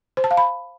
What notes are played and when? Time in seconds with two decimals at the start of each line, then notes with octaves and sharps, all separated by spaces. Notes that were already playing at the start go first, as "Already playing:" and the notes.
0.17 C5
0.24 A5
0.31 F5
0.37 B5